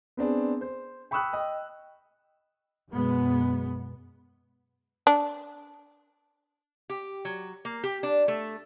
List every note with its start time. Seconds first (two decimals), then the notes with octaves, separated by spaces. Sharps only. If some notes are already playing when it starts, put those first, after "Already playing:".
0.17 B3 C4 D4 G#4
0.61 C5
1.11 G5 B5 C#6 D#6 E6 F#6
1.33 D#5 G5 D#6
2.92 F#2 B2 G#3 B3
5.07 D4
6.90 G4
7.25 F#3
7.65 A#3
7.84 G4
8.03 D4
8.28 A3